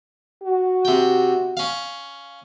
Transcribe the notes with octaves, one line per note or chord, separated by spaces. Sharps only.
F#4
C3 G5
C#4 F5